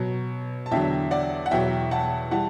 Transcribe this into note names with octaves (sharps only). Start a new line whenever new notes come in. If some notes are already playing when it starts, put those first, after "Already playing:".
Already playing: B2 F#3
A5
E2 D3 F#3 E5 G5
D5 F#5
F#5
E2 B2 F#3 E5 G5
F#5 A5
E3 G3 F#5 A5